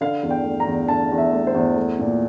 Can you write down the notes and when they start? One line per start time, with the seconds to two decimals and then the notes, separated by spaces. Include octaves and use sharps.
0.01 D3 F5
0.23 E2
0.30 G5
0.45 A3
0.60 A#5
0.67 E2
0.88 D3 A5
1.12 E2
1.18 E5
1.33 A3
1.47 C5
1.55 E2
1.76 A3
1.99 A#2